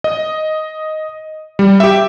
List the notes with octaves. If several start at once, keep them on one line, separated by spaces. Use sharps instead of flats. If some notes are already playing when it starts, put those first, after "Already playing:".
D#5
G3
G4 E5